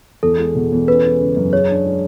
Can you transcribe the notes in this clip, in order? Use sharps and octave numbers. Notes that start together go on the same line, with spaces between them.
E2 A4
G#3
B2
E2
C#4 B4
G#3
C#3
F#2
G#4 C#5
D4
G#3